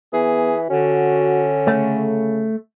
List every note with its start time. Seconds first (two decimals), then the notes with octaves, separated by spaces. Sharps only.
0.13 E3 B3 G#4
0.70 D3 C#4 F#4
1.67 C#3 A3